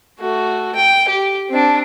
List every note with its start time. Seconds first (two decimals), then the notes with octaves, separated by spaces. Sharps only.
0.19 A3 F#4
0.75 G5
1.09 G4
1.49 C4 D4